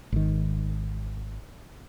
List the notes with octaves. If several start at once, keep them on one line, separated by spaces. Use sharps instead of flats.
G#1 D#3